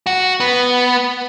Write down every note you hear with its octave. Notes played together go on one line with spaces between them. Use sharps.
F#4
B3